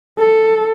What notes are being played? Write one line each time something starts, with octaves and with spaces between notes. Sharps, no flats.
A4